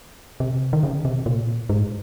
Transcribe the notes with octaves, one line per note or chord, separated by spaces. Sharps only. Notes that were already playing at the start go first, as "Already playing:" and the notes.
C3
D#3
C#3
C3
A#2
G#2